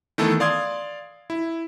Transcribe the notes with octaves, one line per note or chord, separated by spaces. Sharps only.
D#3 E3 A3 B3 A4
D5 F5 C6 D#6 G#6
E4